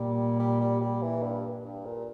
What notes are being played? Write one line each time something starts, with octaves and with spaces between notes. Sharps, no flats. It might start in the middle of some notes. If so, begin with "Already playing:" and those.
Already playing: A#2 G3
G3
G3
G3
E3
G2
G2
A#2